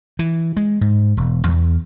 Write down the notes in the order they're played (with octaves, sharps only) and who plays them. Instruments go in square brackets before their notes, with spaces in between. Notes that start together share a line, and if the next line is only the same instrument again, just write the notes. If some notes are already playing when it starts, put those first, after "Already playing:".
[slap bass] E3
G#3
G#2
E1
E2